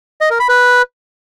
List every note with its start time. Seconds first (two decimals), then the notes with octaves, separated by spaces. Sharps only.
0.21 D#5
0.30 A#4
0.40 B5
0.49 B4